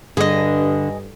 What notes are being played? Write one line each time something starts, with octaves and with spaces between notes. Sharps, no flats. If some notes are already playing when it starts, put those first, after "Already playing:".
G2 D3 G#4 D#5